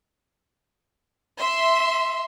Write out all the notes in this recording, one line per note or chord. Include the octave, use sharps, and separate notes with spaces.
E5 C6